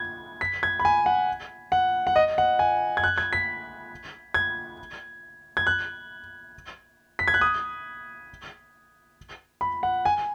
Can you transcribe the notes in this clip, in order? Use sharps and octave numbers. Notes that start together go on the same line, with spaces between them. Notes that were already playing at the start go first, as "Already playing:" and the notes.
Already playing: G#6
B6
G#6
B5
G#5
F#5
F#5
F#5
D#5
F#5
G#5
G#6
F#6
G#6
B6
G#6
G#6
F#6
B6
G#6
F#6
D#6
B5
F#5
G#5